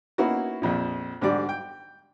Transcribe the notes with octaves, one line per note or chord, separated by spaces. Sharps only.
A#3 B3 C#4 D#4 E4 F#4
A#1 F2 A#2
G#2 D3 F#3 G3 D5
G5